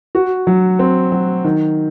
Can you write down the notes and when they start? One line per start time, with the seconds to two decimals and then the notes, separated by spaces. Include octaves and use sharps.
0.15 F#4
0.47 F#3
0.79 C4
1.12 F#3
1.45 D#3